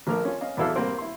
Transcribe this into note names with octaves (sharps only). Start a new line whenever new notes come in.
A#1 F3 A3 A#3 A#4 F6
C#4 F4
C#4 D#5 F5
B1 E2 E4 A4 F5 E6
C2 A#3 C4
E4 C6